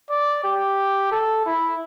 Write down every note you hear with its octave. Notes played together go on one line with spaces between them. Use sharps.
D5
G4
A4
E4